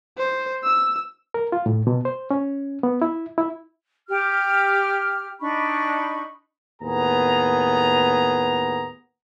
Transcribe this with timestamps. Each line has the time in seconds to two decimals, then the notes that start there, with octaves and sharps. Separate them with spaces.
0.18 C5
0.64 E6
1.34 A#4
1.52 F4
1.66 A2
1.87 B2
2.05 C5
2.31 C#4
2.83 B3
3.02 E4
3.38 E4
4.09 G4 F6
5.40 D4 D#4 B5 C#6
6.82 D#2 A2 B3 G#4 A#5